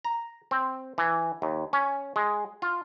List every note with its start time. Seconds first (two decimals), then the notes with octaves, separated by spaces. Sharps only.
0.05 A#5
0.51 C4
0.98 E3
1.42 D#2
1.73 C#4
2.16 G#3
2.62 F4